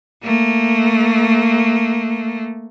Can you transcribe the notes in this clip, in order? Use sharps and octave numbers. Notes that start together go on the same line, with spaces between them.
A3 A#3